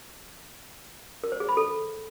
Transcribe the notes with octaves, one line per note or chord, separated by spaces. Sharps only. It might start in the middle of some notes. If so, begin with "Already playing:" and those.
A#4
C5
G#4
B5
A4